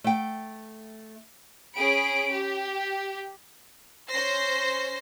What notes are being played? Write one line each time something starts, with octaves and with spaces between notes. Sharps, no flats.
A3 G5
C#4 G#4 B5 D7
G4
C#4 C5 A#6 C7